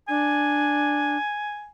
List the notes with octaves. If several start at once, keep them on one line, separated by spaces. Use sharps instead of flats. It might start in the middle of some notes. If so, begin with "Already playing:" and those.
D4 G#5